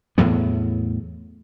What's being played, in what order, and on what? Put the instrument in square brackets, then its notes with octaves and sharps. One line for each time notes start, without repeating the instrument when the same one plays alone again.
[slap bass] E2 A2 F#3 B3